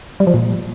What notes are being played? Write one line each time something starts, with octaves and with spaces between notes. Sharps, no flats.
G3
F3
A#2